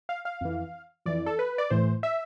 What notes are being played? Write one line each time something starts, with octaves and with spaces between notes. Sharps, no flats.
F5
F5
F2 E3
F2 E3 D5
A4
B4
D5
A2 E3 C5
E5